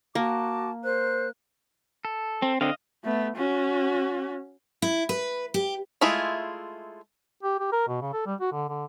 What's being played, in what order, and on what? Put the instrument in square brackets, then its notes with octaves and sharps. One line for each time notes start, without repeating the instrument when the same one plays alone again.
[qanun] A#3 [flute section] F#4 A5 D6
[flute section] A#4 C5 F#6
[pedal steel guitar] A4
[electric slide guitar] C4
[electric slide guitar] D3 C4 [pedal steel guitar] D#5 F5
[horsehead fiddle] A3 B3
C#4 F#4
[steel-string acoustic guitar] E4
B4
G4
[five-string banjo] G#3 A3 E4 F4 G#4
[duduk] G4
G4
A#4
B2
C#3
A4
G3
F#4
D3
D3